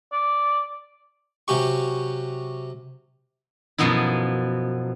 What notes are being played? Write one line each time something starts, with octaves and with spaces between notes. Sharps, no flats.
D5
C3 F#3 C#4 G4 C#6
F#2 B2 F3 B3 D#4 E4